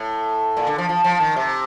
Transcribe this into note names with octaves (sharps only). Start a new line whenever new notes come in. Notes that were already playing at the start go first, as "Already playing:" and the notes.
Already playing: A2
A#2
D3
F3
F3
F3
D#3
C3